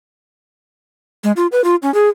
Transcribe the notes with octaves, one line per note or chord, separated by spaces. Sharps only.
G#3
F4
B4
F4
C#4
G#4